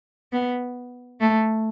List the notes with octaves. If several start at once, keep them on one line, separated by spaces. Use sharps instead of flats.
B3
A3